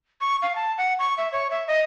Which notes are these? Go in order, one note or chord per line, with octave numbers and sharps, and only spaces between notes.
C#6
F5
A5
F#5
C#6
E5
C#5
E5
D#5